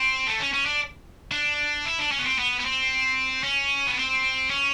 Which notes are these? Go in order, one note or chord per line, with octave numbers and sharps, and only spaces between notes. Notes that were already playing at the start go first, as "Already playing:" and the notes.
Already playing: C4
A3
C#4
C#4
D4
D4
E4
D4
C#4
B3
C4
B3
B3
C4
C#4
B3
C4
C#4